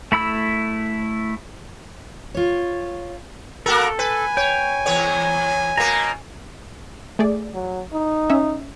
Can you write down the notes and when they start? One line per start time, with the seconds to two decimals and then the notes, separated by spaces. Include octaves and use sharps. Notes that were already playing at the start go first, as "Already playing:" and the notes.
0.12 A3 E4 B5 E6
2.35 F4 C#5
3.66 A#3 F#4 A4 A#4
3.99 B4 G#5
4.37 C#5 G5
4.86 E2 B3 C#5
5.77 B2 A#3 A#5
7.19 A3 G#4 D5
7.54 F#3
7.93 D#4
8.30 C#4 E5